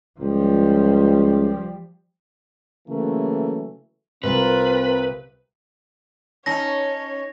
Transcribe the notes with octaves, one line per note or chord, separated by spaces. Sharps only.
C#2 F3 G3
C#3 E3 F#3 A3 A#3
C2 C4 F4 A#4 B4
C#4 D#4 C#5 A5 A#6